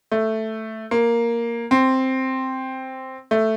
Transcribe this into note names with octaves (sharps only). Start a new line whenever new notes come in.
A3
A#3
C4
A3